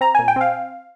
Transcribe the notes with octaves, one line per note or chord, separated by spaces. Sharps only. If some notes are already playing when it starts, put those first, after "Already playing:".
C4 A#5
A#2 G#5
G5
C4 F5